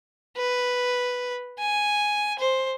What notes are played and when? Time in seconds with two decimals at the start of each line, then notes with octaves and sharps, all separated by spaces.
0.37 B4
1.59 G#5
2.39 C5